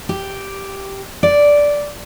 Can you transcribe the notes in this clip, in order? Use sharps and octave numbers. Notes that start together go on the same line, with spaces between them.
G4
D5